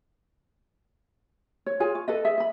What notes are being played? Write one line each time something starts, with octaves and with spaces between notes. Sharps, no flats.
C#5
F4 G#4 C#5 G#5
C#5
A4 B4 D#5
G#4 E5
D#5 B5